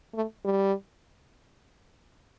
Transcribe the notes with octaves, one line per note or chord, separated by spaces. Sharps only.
A3
G3